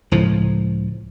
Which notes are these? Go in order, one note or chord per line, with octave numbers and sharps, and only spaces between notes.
C#2 A2 F3